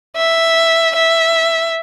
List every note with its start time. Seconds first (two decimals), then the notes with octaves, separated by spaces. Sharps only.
0.17 E5
0.96 E5